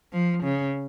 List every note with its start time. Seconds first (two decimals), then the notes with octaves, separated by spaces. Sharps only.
0.13 F3
0.43 C#3